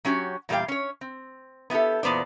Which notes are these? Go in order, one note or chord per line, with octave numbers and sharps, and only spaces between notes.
F#3 C#4 F#4 G4
E2 A#2 G3 C4 F5 G5
C#4 C#5
C4
B3 E4 F#4 G4 A4
E2 A#2 B3 C5 D5